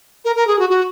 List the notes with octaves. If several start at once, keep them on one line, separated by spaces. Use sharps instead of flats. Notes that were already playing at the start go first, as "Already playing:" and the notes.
A#4
A#4
G#4
F#4
F#4